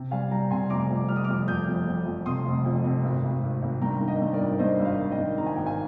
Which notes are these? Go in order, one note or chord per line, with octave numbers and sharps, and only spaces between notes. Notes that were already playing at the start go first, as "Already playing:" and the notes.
Already playing: C3
G3 F5 G#5
G3 G5 A#5
C3 G#5 C6
F1 A#5 D6
F2
G3 F6
D#6
D6 F6
F2
F1 D#6 G6
F2
F2
F2
C3 C6 D#6
F1
F2
C3
G#1
G#1
G#1
G#1
G2 G5 A#5
D#3
D#5 G5
G2
A#4 D5
G#1
G2 C5 D#5
G#1
D5 F5
G#1
D#5 G5
D#3
D#3 A#5
G#5
G#1 G5
F5 G#5